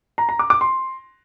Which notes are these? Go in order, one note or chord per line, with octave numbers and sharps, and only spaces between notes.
A#5
A#5
D6
D6
C6